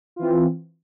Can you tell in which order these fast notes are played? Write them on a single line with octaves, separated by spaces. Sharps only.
F4 E3 C4